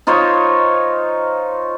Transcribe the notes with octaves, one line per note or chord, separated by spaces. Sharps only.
D#4 F4 C5 C#5